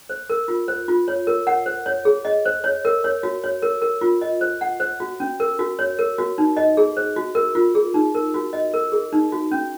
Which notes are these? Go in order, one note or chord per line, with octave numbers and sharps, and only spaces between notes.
C5
A#4
F4
C5
F4
C#5
A#4
F#5
C5
C#5
G#4
D#5
C5
C#5
A#4
C#5
F#4
C#5
A#4
A#4
F4
D#5
C5
F#5
C5
F#4
C#4
A#4
F#4
C#5
A#4
F#4
D#4
D#5
G#4
C5
F#4
A#4
F4
G#4
D#4
A#4
F#4
D#5
A#4
G#4
D#4
F#4
C#4